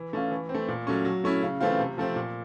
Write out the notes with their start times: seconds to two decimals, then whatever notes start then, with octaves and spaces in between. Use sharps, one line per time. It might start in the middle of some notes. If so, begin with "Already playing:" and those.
Already playing: E3
0.13 A3 C#4 F4
0.31 E3
0.49 C4
0.54 A3
0.68 A#2
0.87 F#3 A3 C#4
1.05 F#3
1.24 A3 C#4 E4
1.42 C#3
1.61 E3 A3 C4 F4
1.79 C3
1.98 F3 A3 C4
2.16 A#2